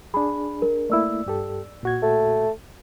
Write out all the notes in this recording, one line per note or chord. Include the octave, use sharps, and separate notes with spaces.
D4 G#4 B5
A#4
A3 A#3 E4 D5 E6
G2 G4 A4
A#2 F#4 G#6
A3